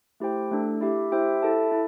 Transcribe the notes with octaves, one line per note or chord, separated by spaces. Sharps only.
A3 E4 G4 C5 G5
A3 D4 A4
E4 G4 E5
E4 G4 C5 E5 G5
E4 A4 E5 A5
E4